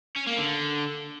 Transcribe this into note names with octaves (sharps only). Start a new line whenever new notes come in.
C#4
A#3
D3